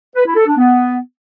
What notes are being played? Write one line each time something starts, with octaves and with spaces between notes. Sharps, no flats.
B4
E4
A4
D4
B3